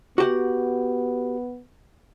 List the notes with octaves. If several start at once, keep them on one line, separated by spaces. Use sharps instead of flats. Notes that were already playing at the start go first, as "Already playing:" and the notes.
B3 F#4 G4 F#5